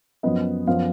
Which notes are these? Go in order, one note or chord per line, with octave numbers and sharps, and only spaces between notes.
F#2 F3 B3 D#5
F#2 F3 B3 F5